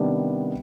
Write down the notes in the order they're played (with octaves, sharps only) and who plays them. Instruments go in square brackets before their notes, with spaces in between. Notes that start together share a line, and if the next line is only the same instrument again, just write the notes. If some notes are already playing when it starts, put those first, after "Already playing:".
Already playing: [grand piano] C3 D#3 G3 B3 D4